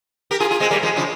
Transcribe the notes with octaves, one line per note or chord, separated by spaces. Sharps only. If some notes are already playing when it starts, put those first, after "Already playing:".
G4 A#4
F4 G#4
F4 G#4
G#3 C4
G3 A#3
F3 G#3
C#3 F3